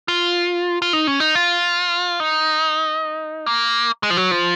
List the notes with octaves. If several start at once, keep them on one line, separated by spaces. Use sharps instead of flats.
F4
F4
D#4
C#4
D#4
F4
D#4
A#3
G#3
F3
F#3
F3